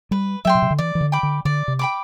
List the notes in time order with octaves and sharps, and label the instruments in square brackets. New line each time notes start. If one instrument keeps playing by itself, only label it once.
[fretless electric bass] G3 [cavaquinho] B4
[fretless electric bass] F#3 [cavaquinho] E5 G5 C6
[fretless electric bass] B2
C3
D3
[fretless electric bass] E3 [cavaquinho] D5
[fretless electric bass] E3
D3
[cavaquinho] G5 B5 D6
[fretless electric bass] D3
[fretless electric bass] D3 [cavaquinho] D5
[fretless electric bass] C3
[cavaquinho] G5 B5 D6